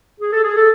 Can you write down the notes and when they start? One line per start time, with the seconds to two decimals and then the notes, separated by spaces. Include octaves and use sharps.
0.20 G#4
0.32 A4
0.44 G#4
0.56 A4